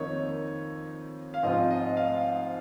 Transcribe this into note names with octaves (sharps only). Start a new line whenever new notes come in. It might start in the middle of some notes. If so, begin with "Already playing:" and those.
Already playing: F2 D#3 A#3 D#4 C#5
F5
G#2 F3 C4 F4 D#5
D#5
F5